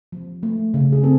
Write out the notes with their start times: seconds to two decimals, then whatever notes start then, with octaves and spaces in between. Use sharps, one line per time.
0.12 F3
0.43 A3
0.74 C#3
0.93 G#4
1.03 C4 A4